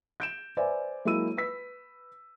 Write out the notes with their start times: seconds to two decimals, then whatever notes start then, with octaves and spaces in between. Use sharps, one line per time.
0.20 G6 D7 E7
0.57 B4 C5 D5 E5 G#5
1.05 F#3 G#3 A#3 E4 E6 D#7
1.37 B4 E6 B6